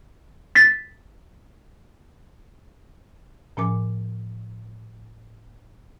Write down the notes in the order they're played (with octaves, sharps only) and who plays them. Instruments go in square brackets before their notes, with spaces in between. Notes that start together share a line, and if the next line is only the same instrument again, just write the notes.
[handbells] A6 B6
[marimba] A2 F3 C#4 A#4 G#5 D6